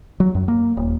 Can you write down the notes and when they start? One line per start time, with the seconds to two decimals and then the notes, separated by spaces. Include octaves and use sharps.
0.20 F#3
0.35 F#2
0.48 A#3
0.77 D#1